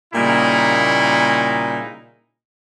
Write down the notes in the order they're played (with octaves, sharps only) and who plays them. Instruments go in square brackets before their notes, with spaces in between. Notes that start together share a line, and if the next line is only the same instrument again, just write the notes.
[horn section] A#2 C#3 G3 A#3 D#4 E4